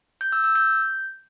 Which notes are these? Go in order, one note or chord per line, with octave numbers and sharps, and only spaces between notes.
G6
E6
E6
G6